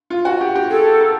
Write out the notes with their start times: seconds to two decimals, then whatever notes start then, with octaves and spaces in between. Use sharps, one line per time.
0.10 F4
0.25 F#4
0.41 G4
0.55 G4
0.70 G#4 A4
1.01 A#4